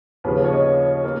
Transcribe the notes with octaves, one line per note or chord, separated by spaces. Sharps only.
D#2 C#3 F3 B4
C#5
D#5
C#5
A#3